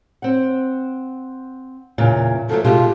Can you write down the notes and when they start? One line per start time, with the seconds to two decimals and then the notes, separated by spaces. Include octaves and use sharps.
0.22 C4 F#5
1.98 E2 A#2 C#3
2.49 F3 F#3 A3 A4
2.64 B2 G#3 F4 G4